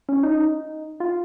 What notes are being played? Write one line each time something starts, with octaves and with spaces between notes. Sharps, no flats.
C#4
D#4
F4